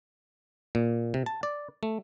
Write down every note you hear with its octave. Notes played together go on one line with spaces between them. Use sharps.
A#2
C3
A5
D5
A3